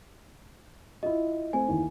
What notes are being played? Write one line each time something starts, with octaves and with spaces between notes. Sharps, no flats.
E4 F4 D#5
A3 C4 G#5
D#2 E3